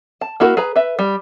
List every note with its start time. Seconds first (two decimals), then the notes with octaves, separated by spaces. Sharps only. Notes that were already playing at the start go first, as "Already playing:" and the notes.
0.21 A5
0.40 A#3 E4 F#4 A#4
0.57 G#4 B4 A#5
0.76 B4 E5
0.99 G3